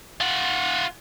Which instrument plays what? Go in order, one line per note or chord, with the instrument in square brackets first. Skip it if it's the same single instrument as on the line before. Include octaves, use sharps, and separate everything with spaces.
[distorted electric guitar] F4 F#5